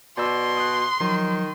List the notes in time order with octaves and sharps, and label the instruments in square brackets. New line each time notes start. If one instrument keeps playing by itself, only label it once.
[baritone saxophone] B2 [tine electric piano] D5 E6 [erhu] C6
[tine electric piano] D#6 F#6
[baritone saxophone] D#3 [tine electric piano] F3 F#3